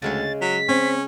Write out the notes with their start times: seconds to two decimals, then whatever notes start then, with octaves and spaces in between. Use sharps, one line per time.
0.02 D2 C#3 G#3 C#5 A6
0.41 F#3 B6
0.68 C4 C#4